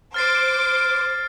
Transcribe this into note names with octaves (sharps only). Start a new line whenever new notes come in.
C5 D6 F6 A6 C7